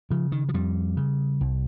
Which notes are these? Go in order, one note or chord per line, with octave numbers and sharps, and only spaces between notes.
C#3 F3
D#3
F3
F2 G3
C#3
C2